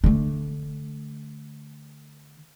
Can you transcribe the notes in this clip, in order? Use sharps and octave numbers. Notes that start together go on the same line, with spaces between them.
D3 A3